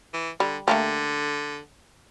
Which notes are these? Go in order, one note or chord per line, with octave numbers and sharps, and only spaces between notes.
E3
D3 G3
D3 A3 A#3 G4